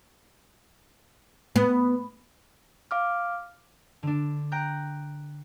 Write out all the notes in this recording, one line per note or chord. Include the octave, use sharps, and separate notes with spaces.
B3
F5 D6 F6
D3 D4
G5 A#5 F#6 G6